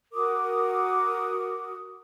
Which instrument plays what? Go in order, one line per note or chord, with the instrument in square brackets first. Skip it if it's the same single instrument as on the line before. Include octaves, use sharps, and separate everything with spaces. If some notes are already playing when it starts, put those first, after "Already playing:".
[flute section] F#4 A#4 D6 D#6